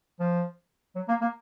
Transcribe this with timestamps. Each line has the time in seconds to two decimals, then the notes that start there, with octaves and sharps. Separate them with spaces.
0.20 F3
0.96 F#3
1.08 A#3
1.21 A#3